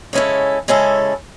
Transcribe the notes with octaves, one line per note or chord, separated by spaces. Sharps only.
C#3 G#3 C#4 E4 A4
C#3 G#3 C#4 E4 A4